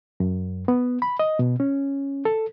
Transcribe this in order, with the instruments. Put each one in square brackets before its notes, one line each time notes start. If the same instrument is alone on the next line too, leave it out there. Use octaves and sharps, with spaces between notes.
[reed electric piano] F#2
B3
B5
D#5
B2
C#4
A4